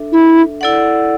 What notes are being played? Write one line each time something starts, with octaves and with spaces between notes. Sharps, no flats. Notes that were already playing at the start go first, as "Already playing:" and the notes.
Already playing: D4 A4 E5
E4
E4 A4 D5 F#5